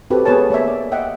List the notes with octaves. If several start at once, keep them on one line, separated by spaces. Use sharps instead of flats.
C4 F#4 G4 A4 B4
B3 G#4 B4 C#5 A5
A#3 C#5 D5 E5
D5
D#5 E5 F#5 G5